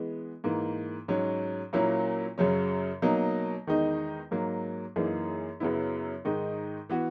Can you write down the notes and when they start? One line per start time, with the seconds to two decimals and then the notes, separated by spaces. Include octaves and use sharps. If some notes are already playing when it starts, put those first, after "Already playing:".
Already playing: E3 G#3 B3
0.44 G#2 E3 A#3
1.08 G#2 F#3 C#4
1.73 A#2 F#3 A#3 C#4 E4
2.38 F#2 C#3 F#3 C#4
3.02 B2 F#3 A#3 D#4
3.67 E2 D#3 G#3 D#4
4.31 G#2 F#3 A#3
4.96 F#2 E3 A#3 D#4 G#4
5.60 F#2 C#3 F#3 B3 E4
6.25 G#2 D#3 G#3 D#4
6.89 E3 B3 F#4